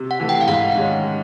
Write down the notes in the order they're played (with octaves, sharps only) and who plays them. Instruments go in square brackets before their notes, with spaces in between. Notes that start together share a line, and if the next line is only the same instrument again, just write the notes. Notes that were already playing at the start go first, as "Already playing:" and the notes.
Already playing: [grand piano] C3
[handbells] F#5
[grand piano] E3 A3
[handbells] G5
F5
[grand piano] G#2 [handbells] F#5
[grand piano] D#3 G#3 C#4